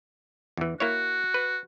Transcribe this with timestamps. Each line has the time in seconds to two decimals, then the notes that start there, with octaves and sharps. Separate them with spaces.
0.57 E2 E3
0.80 A#3 E4 F#4 C#5
1.34 B4